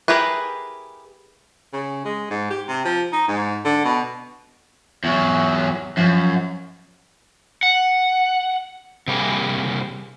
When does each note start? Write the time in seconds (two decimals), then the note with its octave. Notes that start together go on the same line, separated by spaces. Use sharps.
0.08 E4 G4 G#4 A#4 B4
1.73 C#3
2.05 G#3
2.31 G#2
2.50 G4
2.68 C3
2.85 F3
3.12 D#4
3.28 G#2
3.65 D3
3.85 B2
5.04 E2 F#3
5.97 F#2 F3 F4
7.63 F#5
9.08 C3 G3 A#3 G#4